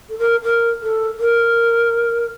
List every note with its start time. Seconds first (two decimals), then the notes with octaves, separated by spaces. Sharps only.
0.08 A4
0.18 A#4
0.43 A#4
0.80 A4
1.19 A#4